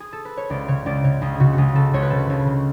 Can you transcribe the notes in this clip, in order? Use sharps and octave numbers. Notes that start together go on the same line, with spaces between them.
G#4
A4
B4
C#5
C#2 D5
C#3 C#5
C#2 D5
C#3 C#5
C#2 G#4
C#3 F#4 G#4
F#4
C#2 G#4
C#3 A4
C#2 C#5
B4
C#3 A4
B4
C#2 C#5
C#3